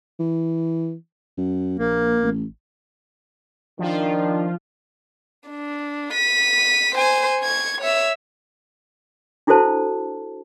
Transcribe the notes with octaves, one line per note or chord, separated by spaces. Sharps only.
E3
F#2
A#1 A#3
A1
D#3 F3 D4 F4
D4
B6 D#7
C5 G#5
C#6 G#6
C#5 E5
D4 E4 F#4 A4 C5 A5